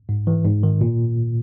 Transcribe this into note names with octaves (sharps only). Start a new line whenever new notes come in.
G#2
E3
G#2
D#3
A#2